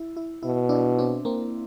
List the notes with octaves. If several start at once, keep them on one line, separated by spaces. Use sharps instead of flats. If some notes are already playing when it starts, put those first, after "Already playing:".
Already playing: E4
E4
B2 E4
D4 E4
C4 D4
A#3 C4